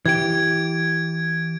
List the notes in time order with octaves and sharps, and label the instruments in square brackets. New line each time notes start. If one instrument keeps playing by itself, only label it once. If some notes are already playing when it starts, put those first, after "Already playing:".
[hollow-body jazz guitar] E3 G4 [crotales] G#6 D7